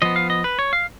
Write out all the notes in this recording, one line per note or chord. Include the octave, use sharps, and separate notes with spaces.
F3 B3 D#5
F5
D#5
B4
C#5
F5